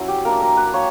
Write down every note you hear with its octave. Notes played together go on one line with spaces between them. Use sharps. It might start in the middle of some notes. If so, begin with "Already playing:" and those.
Already playing: F#3 C#4 E4
G4
A#3 D4 A#4
A#4
B4
A#3 C#5